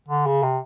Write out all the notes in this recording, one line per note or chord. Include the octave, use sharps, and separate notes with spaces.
D3
C#3
C3